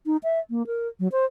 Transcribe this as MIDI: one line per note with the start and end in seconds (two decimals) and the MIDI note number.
0.06 0.17 63
0.23 0.40 76
0.50 0.66 58
0.67 0.88 70
1.00 1.08 54
1.12 1.25 72